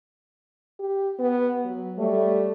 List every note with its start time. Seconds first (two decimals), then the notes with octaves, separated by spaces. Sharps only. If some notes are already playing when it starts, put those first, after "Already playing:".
0.79 G4
1.19 B3
1.65 F#3
1.99 G3 A3 C#5